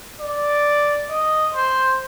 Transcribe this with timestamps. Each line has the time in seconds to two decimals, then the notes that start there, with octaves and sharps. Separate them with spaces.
0.20 D5
1.10 D#5
1.54 C5